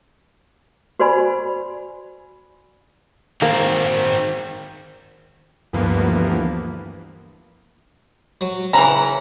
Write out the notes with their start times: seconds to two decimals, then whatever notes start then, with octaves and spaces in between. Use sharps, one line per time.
0.99 F#4 B4 C5 D5 G#5 B5
3.42 D#3 A#3 C4
5.73 D2 G2 E3 F3 A#3 B3
8.41 F#3
8.73 C#3 E3 C#4 F#5 A#5